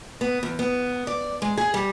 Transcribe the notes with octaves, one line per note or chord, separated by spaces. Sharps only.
B3
E2
B3
D5
G#3
G#4
G3